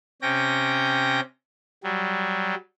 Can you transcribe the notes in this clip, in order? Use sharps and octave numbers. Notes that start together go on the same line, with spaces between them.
C3 C#4 G5 A#6
F#3 G3